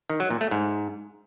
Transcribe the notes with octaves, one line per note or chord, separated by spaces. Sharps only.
D#3
F#3
A#2
A3
G#2